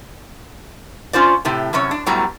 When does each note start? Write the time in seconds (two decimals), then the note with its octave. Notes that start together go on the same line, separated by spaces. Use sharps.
1.13 C#4 F4 C5 D5
1.45 A2 C3 G4
1.73 F#2 C3 C#4 C#5
1.91 D4
2.06 F#2 A2 F#3 G3 B3 A#5